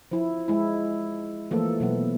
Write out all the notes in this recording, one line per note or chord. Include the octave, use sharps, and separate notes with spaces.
F3 E4
G#3 E4
E3 F3 A3 A#3 A4
B2 F#3 B3